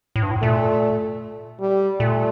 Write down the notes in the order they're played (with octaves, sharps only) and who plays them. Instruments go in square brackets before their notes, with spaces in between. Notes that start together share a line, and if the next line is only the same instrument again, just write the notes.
[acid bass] A2
G2
A2
[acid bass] A#2 [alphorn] A3
[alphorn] G3
[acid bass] A#2 [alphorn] A3